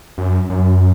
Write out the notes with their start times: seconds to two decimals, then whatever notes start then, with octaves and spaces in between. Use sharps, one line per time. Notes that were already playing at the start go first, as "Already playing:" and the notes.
0.18 F#2
0.50 F#2